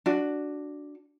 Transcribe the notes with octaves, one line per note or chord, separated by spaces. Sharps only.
D4 F#4